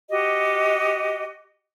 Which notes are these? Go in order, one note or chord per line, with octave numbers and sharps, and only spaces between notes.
F#4 G4 D#5